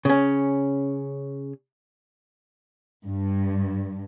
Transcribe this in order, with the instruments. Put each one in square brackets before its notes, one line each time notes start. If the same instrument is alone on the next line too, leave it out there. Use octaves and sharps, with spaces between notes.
[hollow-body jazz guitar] C#3 C#4
[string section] G2